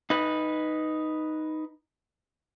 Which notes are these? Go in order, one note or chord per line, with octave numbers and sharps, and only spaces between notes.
D#4 B4